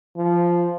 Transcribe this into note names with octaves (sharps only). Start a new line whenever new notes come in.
F3